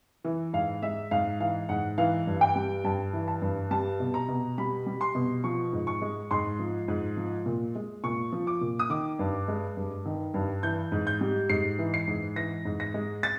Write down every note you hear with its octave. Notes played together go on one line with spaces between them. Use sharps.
E3
G#2 F5
G#3 E5
G#2 F5
E3 F5
G#2 F#5
E3 F5
G2
G5
G3
G2 A5
E3
A5
G2
G3 A5
B2
A#5
B2
G3 B5
G3
C6
B2
F3 C#6
G#2
C#6
G#3
G#2 C6
F3
G#2
F3
A#2
G#3
A#2 C#6
F3
D6
A#2
D#6
D#3 D6
G2
G#3
G2
D#3
G2
E3 G6
G#2
G6
G3
G#2 C7
E3
C7
G#2
E3 A#6
G#2
A#6
G#3
A6